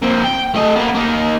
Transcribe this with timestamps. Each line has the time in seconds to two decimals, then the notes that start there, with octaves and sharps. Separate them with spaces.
0.02 A#3 C4
0.24 G5
0.54 A3 D#5
0.76 A#3 B3
0.95 A#3 D#4